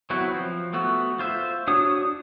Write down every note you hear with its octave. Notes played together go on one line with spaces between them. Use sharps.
F#3 B3 C4 E4 F#4
F3
A3 B3 F#4
F4 C5 E5
D4 F#4 C#5 D#6